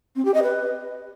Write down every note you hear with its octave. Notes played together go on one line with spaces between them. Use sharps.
C4
G4
D#5
B4